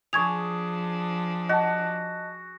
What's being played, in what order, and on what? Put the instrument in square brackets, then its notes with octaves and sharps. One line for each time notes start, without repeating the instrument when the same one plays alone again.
[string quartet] F3 D4 [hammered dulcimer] G#4 [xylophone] C#6 G#6 F7
[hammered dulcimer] F#4 [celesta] D#5 A5